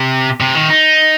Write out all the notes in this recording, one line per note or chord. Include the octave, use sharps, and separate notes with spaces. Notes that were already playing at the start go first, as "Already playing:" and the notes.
Already playing: C3
C3
D#3
D#4